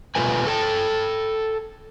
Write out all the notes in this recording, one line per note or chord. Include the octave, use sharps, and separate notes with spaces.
B2 G#3 A3 F4 B4 G#5
A4 G5 A5